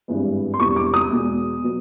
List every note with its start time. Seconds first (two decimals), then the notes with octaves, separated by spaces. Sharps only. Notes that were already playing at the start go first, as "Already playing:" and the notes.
0.08 G#1 G2 E3 G#3 B3
0.54 C6
0.60 E1 E2 C3 E3 G3 C#6
0.76 D6
0.94 D#6
1.11 E2 B2 G#3
1.63 B2 F#3 B3